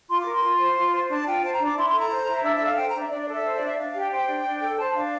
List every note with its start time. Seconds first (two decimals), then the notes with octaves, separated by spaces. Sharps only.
0.08 F4 C6
0.20 D6
0.26 A#4
0.31 C6
0.43 F4
0.59 C5
0.76 F4
0.93 C5
1.09 D4 A5
1.26 F4 G5
1.43 C5 A5
1.53 A#5
1.60 D4
1.65 D6
1.76 E4 C6
1.87 C6
1.93 A4 A#5
2.10 C5
2.27 E4
2.43 D4 E5
2.54 E5
2.59 A4
2.65 F5
2.76 C5 G5
2.88 A#5
2.94 D4 E5
3.10 D4 D5
3.21 D5
3.27 A4 E5
3.44 C5
3.56 D4 D5
3.66 E5
3.77 D4 F5
3.89 F5
3.94 G4
4.00 G5
4.10 C5 G5
4.27 D4
4.44 D4
4.61 A4
4.77 C5 A5
4.94 D4 F5